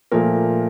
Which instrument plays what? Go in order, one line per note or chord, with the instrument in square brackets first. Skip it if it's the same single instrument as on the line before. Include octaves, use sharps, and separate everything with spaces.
[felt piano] A#2 F3 A3 A#4